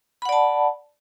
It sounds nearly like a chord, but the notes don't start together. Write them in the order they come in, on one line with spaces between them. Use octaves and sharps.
B5 F#5 D5 A5